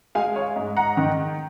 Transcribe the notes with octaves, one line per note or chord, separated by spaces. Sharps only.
G#3 F5 G#5
C#5 F5
G#2
F#5 A#5
D#3